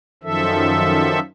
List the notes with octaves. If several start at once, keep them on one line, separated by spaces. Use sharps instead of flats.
F#2 D#3 F3 A4 E5